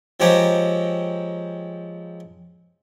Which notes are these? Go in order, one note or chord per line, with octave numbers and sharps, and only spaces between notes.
F3 G#3 C4 G4 C#5 A#5